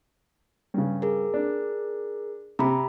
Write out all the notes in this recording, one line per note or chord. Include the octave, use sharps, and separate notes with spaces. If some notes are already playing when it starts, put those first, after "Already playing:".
G2 C#3
G#4 A#4
D4
C3 A#5 B5